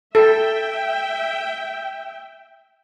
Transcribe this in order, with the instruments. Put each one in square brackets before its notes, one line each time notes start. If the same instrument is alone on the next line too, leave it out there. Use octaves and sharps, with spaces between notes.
[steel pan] A4 [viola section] E5 G5